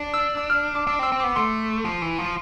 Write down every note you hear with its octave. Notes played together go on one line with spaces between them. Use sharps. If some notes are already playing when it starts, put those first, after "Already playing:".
Already playing: D4
E6
E6
F6
D6
D4 E6
C4 E6
C4
B3 D6
A3 C6
F3
E3
F3